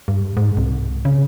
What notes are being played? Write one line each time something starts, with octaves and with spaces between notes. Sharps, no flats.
G2
G#2
C2
C#3